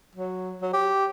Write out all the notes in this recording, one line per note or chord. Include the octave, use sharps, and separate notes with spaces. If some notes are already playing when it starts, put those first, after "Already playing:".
F#3
F#3
G4